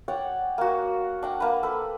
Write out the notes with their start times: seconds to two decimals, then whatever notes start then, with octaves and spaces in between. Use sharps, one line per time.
0.08 C#5 D5 F#5 G5
0.58 A#3 F#4
1.23 D4 F#5 G5
1.40 A#3 D4 B4
1.63 A4 B4